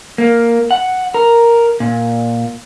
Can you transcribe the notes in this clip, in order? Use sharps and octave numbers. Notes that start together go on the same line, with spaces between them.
A#3
F#5
A#4
A#2